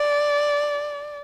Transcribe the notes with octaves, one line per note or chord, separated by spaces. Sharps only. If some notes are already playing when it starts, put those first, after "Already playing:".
Already playing: D5